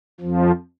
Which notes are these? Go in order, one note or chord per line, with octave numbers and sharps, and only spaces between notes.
F2 F3